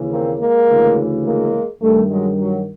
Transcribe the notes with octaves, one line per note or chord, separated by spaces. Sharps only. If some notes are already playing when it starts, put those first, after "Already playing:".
Already playing: D#2 C#3 E3
A#3 C4
G#3 A#3
D2 C#3 E3
G#3 A#3
G2 D#3 G3 A3
F#3 G#3
F#3